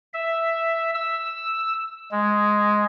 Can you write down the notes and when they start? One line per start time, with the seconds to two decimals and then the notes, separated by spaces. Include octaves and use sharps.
0.14 E5
0.94 E6
2.11 G#3